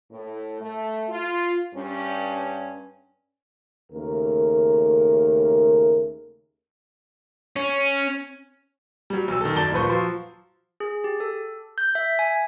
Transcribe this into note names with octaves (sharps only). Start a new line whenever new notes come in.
A2
A3
F4
G2 C#4
D#2 C#3 A3 A#4
C#4
F#3 G3
B1 E6
D#3 A4
F#2 D5 A5 G7
D#1 A#2 B4 C5 C#6
F3 F#3 C6
G#4
G4
A4
G6
E5
G#5